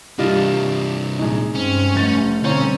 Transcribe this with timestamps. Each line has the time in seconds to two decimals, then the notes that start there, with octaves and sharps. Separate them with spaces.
0.19 C2 G3 D4 F4 D#5
1.19 A#1 G#3 D#4
1.55 G2 C4 C#4
1.95 F1 G3 A3 A6
2.44 G2 B2 D3 C4 C#4 C#5 A#5